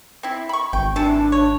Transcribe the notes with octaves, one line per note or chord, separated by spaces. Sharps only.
C4 E4
B5 C#6
G#1 G5
C3 E3 D4 A5
C#5